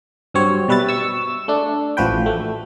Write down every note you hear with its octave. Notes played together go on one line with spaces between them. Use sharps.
G2 F#3 C4 C#5
B2 G3 B4 E5 A6
C#6 E6
A3 D4
A1 F3 F#4 B4 G5
A3